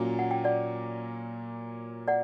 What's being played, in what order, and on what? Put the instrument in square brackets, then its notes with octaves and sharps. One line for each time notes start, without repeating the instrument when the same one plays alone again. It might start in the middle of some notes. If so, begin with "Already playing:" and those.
Already playing: [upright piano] A#2 F#3 A#3 C#4
[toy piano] F#5
G5
D5 F#5
D5 F#5